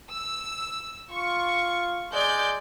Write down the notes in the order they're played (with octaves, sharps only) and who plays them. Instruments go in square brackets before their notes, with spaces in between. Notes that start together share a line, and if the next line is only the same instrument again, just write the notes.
[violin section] E6
[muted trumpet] F4 [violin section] C#6
[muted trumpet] G#3 [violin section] D5 G6